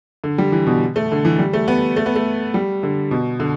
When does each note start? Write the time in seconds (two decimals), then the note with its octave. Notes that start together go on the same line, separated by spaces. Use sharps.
0.24 D3
0.38 G3
0.52 E3
0.67 B2
0.96 A3
1.12 D3
1.25 E3
1.39 G3
1.53 A3
1.68 B3
1.97 A3
2.06 B3
2.16 A3
2.54 G3
2.83 D3
3.11 B2
3.40 D3